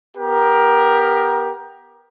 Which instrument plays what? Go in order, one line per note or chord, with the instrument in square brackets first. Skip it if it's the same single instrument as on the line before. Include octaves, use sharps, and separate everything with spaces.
[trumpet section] B3 G4 A#4